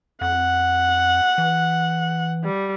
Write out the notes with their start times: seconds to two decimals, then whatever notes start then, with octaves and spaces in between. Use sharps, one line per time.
0.21 F2 F#5
1.38 E3
2.44 G3